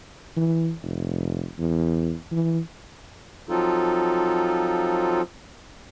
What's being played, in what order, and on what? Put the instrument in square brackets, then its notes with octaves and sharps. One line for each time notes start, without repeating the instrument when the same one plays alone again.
[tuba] E3
F1
E2
E3
[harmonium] F3 F#3 C4 D#4 F4 A4